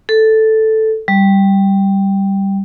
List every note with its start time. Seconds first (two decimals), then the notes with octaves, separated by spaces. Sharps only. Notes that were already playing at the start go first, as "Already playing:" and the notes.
0.09 A4
1.08 G3